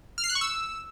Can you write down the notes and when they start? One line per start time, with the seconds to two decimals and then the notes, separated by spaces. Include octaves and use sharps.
0.18 F6
0.24 C7
0.30 F#6
0.35 C#6
0.41 E6